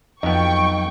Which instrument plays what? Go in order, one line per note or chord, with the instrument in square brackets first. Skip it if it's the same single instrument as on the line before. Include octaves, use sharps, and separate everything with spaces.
[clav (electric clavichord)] F2 B3 [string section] F#3 G5 C#6 [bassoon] D#4